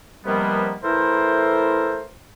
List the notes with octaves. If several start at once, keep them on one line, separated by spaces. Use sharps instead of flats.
C3 D#3 F3 G3 A#3 B3
E3 A3 E4 A4 A#4 C5